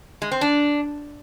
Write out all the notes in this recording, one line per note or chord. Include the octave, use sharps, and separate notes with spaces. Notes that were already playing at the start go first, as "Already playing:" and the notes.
G#3
C4
D4